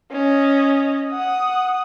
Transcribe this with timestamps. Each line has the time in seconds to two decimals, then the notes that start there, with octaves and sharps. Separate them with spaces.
0.12 C#4 D#5
1.11 F#5 D#6